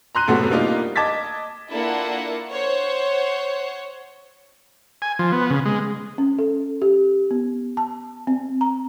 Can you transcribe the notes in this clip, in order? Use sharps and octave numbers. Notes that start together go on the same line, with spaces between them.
A#5 C6 F#6 D#7
F#2 A2 C3 A3 B3 F#4
G3 A#3 D4 D#4 F4
D#5 A5 D6 G#6 A6 B6
A#3 D4 E4 F4 A4 F#5
C5 C#5 F#5
G#5
F3
B3
C#3
G#3
C#4
A4
G4
B3
A5
C4
A#5